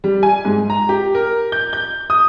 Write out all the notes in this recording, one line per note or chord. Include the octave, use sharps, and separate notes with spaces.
G3
G#5
G#2
A#5
G4
A#4
G6
G6
D#6